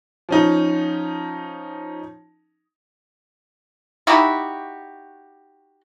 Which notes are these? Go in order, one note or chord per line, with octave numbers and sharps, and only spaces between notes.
F3 C#4 D#4
D#4 E4 F#4 G4